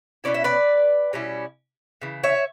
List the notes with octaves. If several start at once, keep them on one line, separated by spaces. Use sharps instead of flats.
B2 G3 C#4 E4 D5
E5
B4 D5
B2 G3 C#4 E4
C#3 E3
C#5 E5